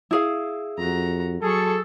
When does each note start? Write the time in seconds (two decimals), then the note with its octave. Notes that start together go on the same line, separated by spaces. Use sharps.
0.11 E4 G#4 F5
0.78 F2 F#4 A#5
1.42 F#3 G#4 A4 C#6